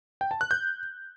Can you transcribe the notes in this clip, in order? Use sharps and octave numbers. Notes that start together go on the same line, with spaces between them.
G5
A5
F#6
G6